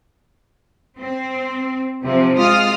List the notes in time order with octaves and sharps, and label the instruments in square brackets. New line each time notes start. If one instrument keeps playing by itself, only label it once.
[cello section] C4
[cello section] C3 F3 [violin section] C4
[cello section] G#3 [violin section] F4 D#6 F6